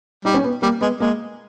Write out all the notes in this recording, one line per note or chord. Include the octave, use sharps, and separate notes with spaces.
G3 D#4
C#4
B3
G3 A#3
G#3 B3
G#3 A#3